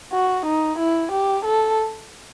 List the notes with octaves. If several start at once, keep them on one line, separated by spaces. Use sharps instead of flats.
F#4
D#4
E4
G4
A4